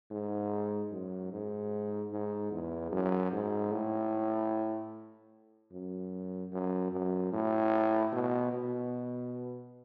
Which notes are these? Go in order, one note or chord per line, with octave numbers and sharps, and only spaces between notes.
G#2
F#2
G#2
G#2
E2
F#2
G#2
A2
F#2
F#2
F#2
A2
B2
B2